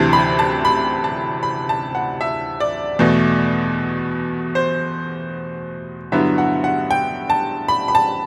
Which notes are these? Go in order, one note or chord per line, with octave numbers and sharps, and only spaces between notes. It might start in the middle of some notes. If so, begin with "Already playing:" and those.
Already playing: D2 C3 E3 A5
B5
A5
B5
A5
B5
A5
F#5
E5
D5
E2 B2 A3
C5
G2 D3 F#3 B3 E4 E5
F#5
F#5
G5
A5
B5
B5
A5